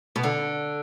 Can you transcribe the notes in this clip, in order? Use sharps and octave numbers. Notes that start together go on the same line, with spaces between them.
B2
D3